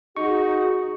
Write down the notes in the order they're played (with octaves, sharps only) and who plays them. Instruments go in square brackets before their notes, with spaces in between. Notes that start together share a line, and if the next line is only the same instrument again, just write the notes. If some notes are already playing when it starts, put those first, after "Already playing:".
[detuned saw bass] D#4 [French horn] F#4 [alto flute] G#4 [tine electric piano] C#6